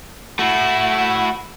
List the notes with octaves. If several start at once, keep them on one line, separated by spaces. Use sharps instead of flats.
A3 E4 F#4